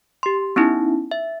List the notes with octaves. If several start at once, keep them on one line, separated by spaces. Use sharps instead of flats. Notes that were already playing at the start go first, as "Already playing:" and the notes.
G4 C6
B3 C#4 D#4 E4
E5